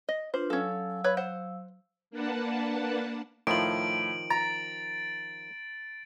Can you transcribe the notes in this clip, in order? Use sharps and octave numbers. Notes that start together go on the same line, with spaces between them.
D#5
D4 F4 B4 C5
F#3 C#4 A4 F5 E6
B4 C#5 B5
C5 F#5
A#3 D4 B4 F#5 A5
A2 D#3 F3 F4 D7 F#7
A#5 A6